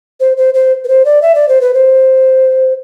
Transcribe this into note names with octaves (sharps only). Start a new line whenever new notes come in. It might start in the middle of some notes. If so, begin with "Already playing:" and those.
C5
C5
C5
B4
C5
D5
E5
D5
C5
B4
C5